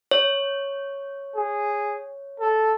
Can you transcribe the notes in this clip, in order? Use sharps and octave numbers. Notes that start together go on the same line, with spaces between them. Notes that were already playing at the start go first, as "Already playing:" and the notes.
C#5
G#4
A4